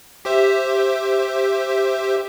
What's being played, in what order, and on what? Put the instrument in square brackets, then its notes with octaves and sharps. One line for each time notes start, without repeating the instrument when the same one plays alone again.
[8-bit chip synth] G4 C5 E5